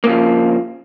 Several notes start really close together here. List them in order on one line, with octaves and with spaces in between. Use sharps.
A#3 C#3 F3